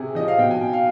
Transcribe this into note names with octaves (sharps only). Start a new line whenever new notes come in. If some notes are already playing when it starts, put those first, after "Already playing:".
Already playing: C3 G#4
F3 D#5
F5
B2 G5
G#5
G5
F5